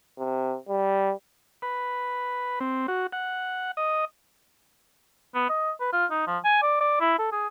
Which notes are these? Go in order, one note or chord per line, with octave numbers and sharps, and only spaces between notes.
C3
G3
B4
C4
F#4
F#5
D#5
B3
D#5
B4
F4
D#4
F3
G#5
D5
D5
E4
A4
G#4